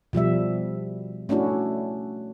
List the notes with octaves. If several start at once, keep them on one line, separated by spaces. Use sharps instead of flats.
B2 F3 G3 E5
A3 C#4 D4 E4 F#4